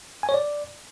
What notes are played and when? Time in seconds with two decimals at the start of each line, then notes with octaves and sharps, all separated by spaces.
0.23 G#5
0.29 C#5
0.34 D5